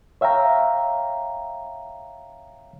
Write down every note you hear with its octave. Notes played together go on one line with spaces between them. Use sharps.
C#5 E5 F5 G5 A#5